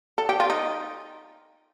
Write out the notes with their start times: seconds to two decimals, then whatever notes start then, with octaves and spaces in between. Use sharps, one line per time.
0.18 A4
0.29 G4
0.40 F4
0.50 D#4